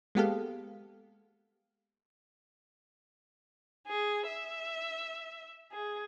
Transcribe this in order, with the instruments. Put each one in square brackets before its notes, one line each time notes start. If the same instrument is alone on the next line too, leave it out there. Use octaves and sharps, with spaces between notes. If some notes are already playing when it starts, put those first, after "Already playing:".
[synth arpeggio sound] G#3 A#3 B3 G4 A4 F5
[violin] G#4
E5
G#4